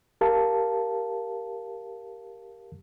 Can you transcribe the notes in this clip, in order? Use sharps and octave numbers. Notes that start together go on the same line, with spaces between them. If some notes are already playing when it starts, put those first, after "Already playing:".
G4 A#4 F5 A5